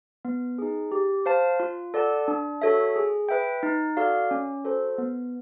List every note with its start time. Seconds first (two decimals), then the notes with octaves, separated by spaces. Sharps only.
0.25 B3
0.58 D#4 G#4
0.92 G4
1.26 C5 F5 A5
1.60 F4
1.94 A4 D5 F#5 A5
2.28 D4
2.62 F#4 A4 C#5 E5
2.96 G#4
3.29 B4 E5 G5
3.63 D#4
3.97 F#4 A4 D5 F5
4.31 C#4
4.64 F#4 A4 C5
4.98 B3